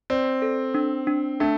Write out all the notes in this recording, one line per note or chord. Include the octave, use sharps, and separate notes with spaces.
C4 D5
A4
D4
D4
A3 D4